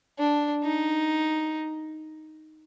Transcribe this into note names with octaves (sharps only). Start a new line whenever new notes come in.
D4
D#4